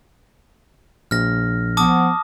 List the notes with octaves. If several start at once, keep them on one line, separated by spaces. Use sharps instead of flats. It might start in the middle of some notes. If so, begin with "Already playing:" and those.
A#1 F6 A#6
F3 B3 A5 D6 D#6